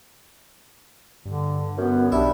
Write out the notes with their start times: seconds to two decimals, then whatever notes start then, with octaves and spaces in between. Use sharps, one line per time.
1.26 G2 D3
1.78 F#2 B3
2.12 B1 G3 D4 E4